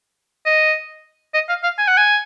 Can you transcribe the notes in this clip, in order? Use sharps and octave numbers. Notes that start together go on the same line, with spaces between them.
D#5
D#5
F5
F5
G#5
F#5
G#5